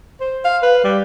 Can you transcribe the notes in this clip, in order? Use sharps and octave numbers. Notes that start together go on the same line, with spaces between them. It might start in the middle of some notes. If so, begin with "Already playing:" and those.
C5
F5
B4
G3